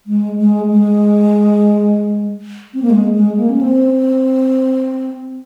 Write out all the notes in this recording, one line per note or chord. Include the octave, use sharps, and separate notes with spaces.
G#3
G#3
G#3
C4
A#3
G#3
G#3
A#3
C#4
C4